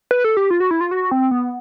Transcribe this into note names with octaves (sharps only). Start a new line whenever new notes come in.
B4
A4
G4
F4
F#4
E4
F4
F#4
C4
B3